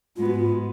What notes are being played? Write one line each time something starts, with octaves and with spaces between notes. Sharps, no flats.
G#2 G#3 B3 F4
F#4
F4